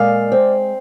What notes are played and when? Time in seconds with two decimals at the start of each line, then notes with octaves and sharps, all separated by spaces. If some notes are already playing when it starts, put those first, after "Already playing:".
Already playing: A#2 G#3 D5 F5
0.32 C4